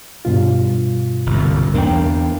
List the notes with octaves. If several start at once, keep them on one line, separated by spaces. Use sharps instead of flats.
G2 B2 F4
G1 C2
E2 A#3 D4 A#4 G5